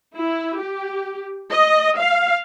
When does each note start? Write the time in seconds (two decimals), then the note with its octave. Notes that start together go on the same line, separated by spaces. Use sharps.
0.15 E4
0.58 G4
1.51 D#5
2.00 F5